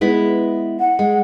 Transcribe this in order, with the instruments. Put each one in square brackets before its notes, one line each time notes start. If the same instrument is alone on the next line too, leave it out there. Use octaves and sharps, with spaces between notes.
[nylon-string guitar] G#3 B3 E4
[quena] F#5
[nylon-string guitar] G#3